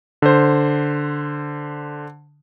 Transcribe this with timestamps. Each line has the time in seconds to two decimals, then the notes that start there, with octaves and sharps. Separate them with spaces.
0.22 D3 C5